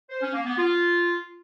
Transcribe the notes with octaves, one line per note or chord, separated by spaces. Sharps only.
C5
C#4
A#3
B3
F4